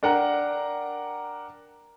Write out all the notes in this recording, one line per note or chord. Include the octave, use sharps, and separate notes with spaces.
D4 A#4 F#5 G5 A#5